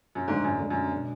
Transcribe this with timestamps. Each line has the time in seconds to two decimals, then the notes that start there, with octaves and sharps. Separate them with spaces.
0.15 F#2
0.28 D2 G#2 D3 A3 D4
0.45 F#2
0.59 D2 D3 G#3 D4
0.70 F#2
0.91 B2 G#3 D4